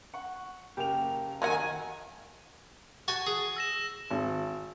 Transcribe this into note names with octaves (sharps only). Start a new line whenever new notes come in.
F#5 C#6
F#1 A#3 G4 F7
D#2 D#3 F#3 A#3 F#5 G#5 A#5
F#4 G#5 A5
G#4
E6 A#6 E7
G#1